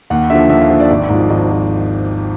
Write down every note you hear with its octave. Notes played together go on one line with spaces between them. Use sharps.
D#2 F#5
D3 F3 E5
D#2 E5
F5
D3 F3
D5
G#1 D5
G#2 F3
G#1 D#5
F3